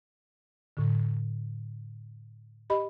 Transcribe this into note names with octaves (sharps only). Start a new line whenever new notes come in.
A2 D3
G4 D#5 B5